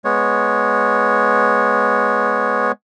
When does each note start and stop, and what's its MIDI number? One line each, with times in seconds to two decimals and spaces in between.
0.05 2.72 56
0.05 2.72 59
0.05 2.72 73